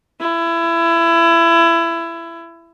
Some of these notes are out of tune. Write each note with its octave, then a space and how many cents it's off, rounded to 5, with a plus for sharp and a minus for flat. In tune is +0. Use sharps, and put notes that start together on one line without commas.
E4 +25